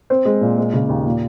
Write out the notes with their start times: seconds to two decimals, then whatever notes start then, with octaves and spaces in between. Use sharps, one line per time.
0.10 C4
0.25 G#3
0.41 A#2
0.58 G#3
0.73 C#3
0.89 D#2
1.06 A#2